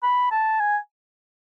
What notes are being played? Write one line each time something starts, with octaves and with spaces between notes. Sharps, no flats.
B5
A5
G#5